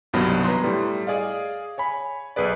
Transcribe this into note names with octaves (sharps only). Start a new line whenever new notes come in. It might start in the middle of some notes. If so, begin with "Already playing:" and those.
C2 G2 B2 D#3 F#3 B3
B4 A#5 C6
A2 G3
G#4 D5 D#5 F5
C#5 G#5 B5
B1 G#4 B4 D5